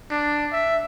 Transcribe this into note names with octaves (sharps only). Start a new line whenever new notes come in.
D4
E5